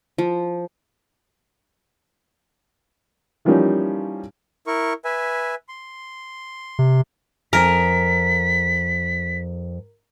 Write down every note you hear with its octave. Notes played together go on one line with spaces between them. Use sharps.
F3
E3 F3 G3 A#3 C#4 D#4
E4 A#4 C#6
B4 E5 G#5
C6
C3
F2 A#4 G#5 B6